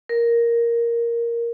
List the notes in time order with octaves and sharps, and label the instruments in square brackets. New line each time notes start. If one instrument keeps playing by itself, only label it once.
[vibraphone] A#4